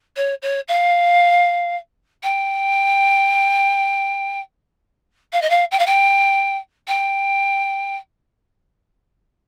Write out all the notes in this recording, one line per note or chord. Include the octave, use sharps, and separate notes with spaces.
C#5
C#5
F5
G5
F5
D#5
F5
G5
F5
G5
G5